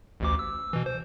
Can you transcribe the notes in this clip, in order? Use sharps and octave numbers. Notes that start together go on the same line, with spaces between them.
A1 D2 D6
E6
B2 E3
C5